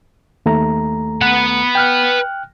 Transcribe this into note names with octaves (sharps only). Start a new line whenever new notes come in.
D#2 A3 A#5
B4 F#5
G5 F6 F#6